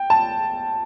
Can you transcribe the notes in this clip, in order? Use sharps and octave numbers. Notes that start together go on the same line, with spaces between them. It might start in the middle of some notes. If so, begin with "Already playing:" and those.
Already playing: G5
A5